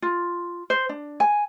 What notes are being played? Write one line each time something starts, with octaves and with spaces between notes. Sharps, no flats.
F4
C5
D4
G#5